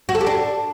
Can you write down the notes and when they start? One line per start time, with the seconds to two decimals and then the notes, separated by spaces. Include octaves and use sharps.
0.09 F#4
0.15 A4
0.21 G4
0.27 D4